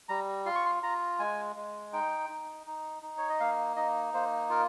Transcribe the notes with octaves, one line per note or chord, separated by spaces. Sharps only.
G3 A#5
F4 C6
C#6
C6
F4 A#5
G#3 G#5
G#3
D#4 G5
D#4
D#4
D#4
C#5
D#5
A#3 F5
D#4 D#5
A#3 C5
F4 A#4